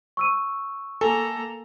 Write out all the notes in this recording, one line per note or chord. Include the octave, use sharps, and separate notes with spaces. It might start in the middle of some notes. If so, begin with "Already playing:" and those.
C#6 E6 D#7
A#3 A4 G#5 A#5